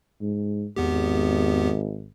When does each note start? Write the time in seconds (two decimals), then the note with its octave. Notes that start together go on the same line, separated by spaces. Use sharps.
0.21 G#2
0.76 G#1 E2 B3 G4